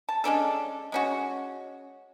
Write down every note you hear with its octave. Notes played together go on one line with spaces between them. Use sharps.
A5
G#3 C#4 D4 A4
G#3 C#4 F#4